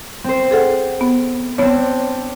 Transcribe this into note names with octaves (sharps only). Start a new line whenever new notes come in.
C4 C5
G#4 A4 F#5
B3
B3 C4 D4 C#5